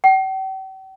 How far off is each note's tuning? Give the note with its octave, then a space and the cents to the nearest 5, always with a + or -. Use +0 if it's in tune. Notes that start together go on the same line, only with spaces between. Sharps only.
G5 -45